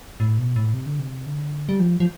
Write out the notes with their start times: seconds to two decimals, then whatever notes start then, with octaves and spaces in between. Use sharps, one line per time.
0.20 A2
0.38 B2
0.56 A2
0.74 C3
0.86 D3
0.99 C3
1.26 D3
1.69 G3
1.80 F3
2.00 F3